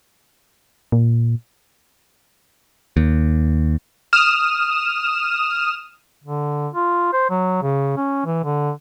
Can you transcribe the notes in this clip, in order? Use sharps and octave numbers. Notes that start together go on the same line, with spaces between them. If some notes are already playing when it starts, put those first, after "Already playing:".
A#2
D#2
D#6 F6 E7
D3
F4
C5
F#3
C#3
C#4
E3
D3